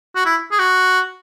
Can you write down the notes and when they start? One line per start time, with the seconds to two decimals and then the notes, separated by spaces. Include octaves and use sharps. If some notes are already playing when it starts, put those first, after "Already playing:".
0.16 F#4
0.25 E4
0.51 G#4
0.59 F#4